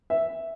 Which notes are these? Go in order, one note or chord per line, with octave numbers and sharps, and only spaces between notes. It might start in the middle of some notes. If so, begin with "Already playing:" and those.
E5